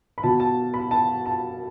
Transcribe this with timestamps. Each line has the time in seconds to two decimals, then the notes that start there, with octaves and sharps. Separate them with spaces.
0.18 B5
0.23 B2 A5
0.40 A5
0.74 B5
0.91 A5
1.26 A5